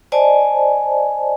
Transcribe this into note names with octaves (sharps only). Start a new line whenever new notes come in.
C5 D5 D#5 G#5 A5